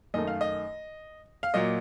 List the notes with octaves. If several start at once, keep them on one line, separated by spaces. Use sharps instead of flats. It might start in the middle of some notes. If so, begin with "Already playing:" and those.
F#2 D#3 A3 D#5
F5
D#5
F5
A#2 F#3 A#3 D#5